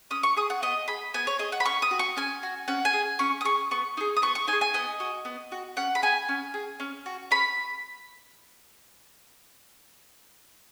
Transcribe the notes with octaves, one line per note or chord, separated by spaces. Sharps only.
C#4 D#6
C#6
G#4 D#6
F#5
B3 D#5
G#4 B5
B3 G#5
C#5
G#4 D#5
F#5
B5
C#4 C#6
D#6
F#4
C#6
C#4 G#5
F#4
C#4 F#5
G#5
G#4
C#4 C#6
D#6
G#4 C#6
B3 C#6
D#4 G#4
D#6
B3 C#6
C#6
D#4 G#5
G#4
G#5
B3 D#5
F#4
B3
F#4
C#4 F#5
B5
G#4 G#5
C#4
G#4
C#4
F#4
C#4 B5